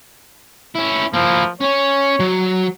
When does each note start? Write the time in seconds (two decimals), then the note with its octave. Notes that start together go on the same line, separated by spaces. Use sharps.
0.75 C#4 E4
1.13 F3 A#3 E4
1.61 C#4 C#5 G#5
2.20 F#3